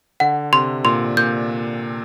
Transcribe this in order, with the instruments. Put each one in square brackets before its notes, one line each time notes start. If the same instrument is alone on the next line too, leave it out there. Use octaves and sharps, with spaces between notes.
[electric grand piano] D3 [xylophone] F#5
[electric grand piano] C3 [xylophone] C6
[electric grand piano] A#2 [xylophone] C6
[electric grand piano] A#2 [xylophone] G6